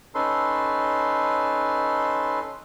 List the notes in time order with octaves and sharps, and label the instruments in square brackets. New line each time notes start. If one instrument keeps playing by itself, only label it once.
[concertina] C#4 D#4 A4 B4 C6